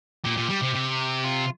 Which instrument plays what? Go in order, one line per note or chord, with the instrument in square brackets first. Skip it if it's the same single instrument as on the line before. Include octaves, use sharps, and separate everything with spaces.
[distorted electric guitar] A#2 [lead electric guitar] G4
[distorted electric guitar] A#2
G3
C3
C3
[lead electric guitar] F4